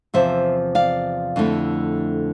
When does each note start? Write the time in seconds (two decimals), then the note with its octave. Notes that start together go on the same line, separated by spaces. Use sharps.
0.14 E2 C3 F3 C5 E5
0.75 D5 F5
1.36 F2 D3 A3 E4